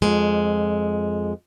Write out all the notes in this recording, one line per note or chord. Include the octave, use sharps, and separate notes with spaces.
F2 G#3